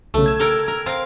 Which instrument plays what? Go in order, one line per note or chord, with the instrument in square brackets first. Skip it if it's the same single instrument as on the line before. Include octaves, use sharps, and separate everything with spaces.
[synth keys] B1 C#3 [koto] A3
[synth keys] E6 G#6
[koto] A4 A#4 G5
A#4
C4 F5 A#5